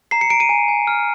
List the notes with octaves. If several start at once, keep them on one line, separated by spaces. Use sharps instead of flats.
A#5 C7
C#7
A#5 D7
D#7
G#5
G#5
F6